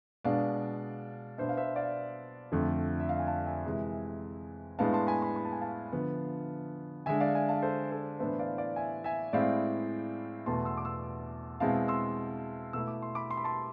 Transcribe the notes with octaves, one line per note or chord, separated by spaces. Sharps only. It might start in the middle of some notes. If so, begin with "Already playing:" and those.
B2 G#3 D4 D5 F5
B2 B3 D4 C5 E5
F5
C5 E5
D5 F5
F2 D3 F3 A3
E5
F5
G#5
F5 A5
E5 G#5
C3 E3 G#3
A2 G#3 B3 D4 F5 A5
A5 C6
G#5 B5
G#5 B5
B5
A5
G#5
F5 A5
D3 F3 B3
D3 G#3 D4 E5 G#5
D5 F5
E5 G#5
F5 A5
A4 C5
A4 C5
A2 E3 B3 D4 C5 E5
D5 F5
D5 F5
E5 G#5
E5 G#5
A2 G#3 C4 E4 D5 F5
E2 B2 A3 A5 C6
C6 E6
D6
C6 E6
B2 G#3 C4 E4 F5 A5
C6 E6
B2 A3 E4 E6
D6
C6
B5 D6
C6
B5
A5 C6